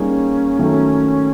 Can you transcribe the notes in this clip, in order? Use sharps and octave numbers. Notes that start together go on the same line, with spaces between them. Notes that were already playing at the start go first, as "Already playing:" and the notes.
Already playing: G3 A#3 C#4 D#4 G#4
D#3 F#3 A3